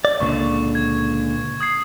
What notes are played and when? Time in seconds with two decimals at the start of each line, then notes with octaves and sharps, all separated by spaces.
0.05 D5
0.20 C#2 A#2 D3 C#6
0.75 G#6
1.60 D#6 G#6 C7